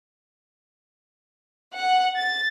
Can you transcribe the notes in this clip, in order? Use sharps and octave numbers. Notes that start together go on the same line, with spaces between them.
F#5
A6